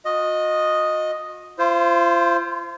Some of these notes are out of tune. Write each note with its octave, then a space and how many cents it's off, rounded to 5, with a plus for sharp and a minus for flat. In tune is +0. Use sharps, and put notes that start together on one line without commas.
F#4 -45 D#5 +0
F4 -35 C5 +0